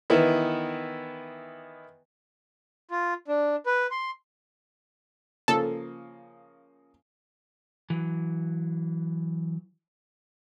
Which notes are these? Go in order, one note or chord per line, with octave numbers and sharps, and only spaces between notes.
D#3 E3 B3 E4
F4
D4
B4
C6
C#3 F3 A#3 A4
E3 F#3